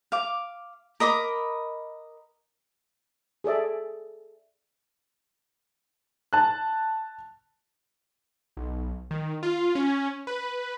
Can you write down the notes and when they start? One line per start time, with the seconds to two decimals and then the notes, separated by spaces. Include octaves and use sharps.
0.12 F5 D6
1.00 A#4 D#5 B5 D6
3.44 G#4 A4 D5 E5
6.33 A5 F#6
8.57 B1
9.11 D#3
9.43 F4
9.75 C#4
10.27 B4